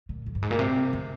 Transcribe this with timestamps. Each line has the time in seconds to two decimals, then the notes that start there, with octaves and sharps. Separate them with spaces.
0.09 A#2
0.26 F2
0.35 G2
0.42 G#2
0.51 A#2
0.59 C3
0.93 C3